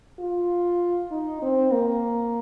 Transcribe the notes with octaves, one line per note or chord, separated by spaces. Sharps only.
F4
D#4
C4
A#3